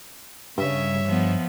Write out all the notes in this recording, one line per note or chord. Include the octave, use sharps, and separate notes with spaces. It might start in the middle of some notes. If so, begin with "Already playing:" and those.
G2 C#3 C#5 E5
F3 B3